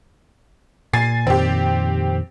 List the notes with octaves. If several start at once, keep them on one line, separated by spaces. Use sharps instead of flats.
A#2 G#5 A6 C7
F2 A#2 D#3 C4 G4